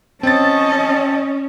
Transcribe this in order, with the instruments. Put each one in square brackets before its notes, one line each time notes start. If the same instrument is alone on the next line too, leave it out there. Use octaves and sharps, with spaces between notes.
[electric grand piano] C4 A6 [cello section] C#4 [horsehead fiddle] D#5 A5